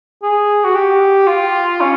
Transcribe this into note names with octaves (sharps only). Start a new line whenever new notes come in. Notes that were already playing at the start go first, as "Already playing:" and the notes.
G#4
F#4
G4
F4
C#4